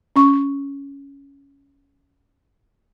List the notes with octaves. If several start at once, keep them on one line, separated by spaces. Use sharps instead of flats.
C#4 C#6